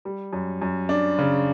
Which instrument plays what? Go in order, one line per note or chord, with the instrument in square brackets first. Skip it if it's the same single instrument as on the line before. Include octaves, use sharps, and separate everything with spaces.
[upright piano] G3
F#2
F#2
D4
C#3